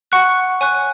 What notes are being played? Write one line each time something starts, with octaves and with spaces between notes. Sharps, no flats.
F#5 C#6 F#6
C#5 G#5 C#6 F#6